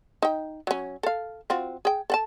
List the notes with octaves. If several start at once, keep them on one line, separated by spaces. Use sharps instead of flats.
D#4 G5
F#3 C#4
A4 F5
C4 F4 F#4
G#4 G5
A4 F#5 A5